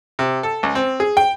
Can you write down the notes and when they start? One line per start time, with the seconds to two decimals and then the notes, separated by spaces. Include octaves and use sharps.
0.19 C3
0.43 A4
0.63 C#2
0.75 C4
1.00 G#4
1.17 G5